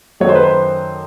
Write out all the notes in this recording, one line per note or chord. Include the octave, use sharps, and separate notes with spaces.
F#2 D#3 F#3 A3 C#5
C5
B4
C5